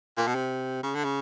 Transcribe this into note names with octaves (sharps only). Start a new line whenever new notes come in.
A#2
B2
C3
C#3
D3
C#3